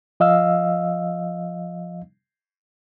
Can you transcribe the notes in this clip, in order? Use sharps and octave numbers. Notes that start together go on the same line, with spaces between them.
F3 D#5 F5 E6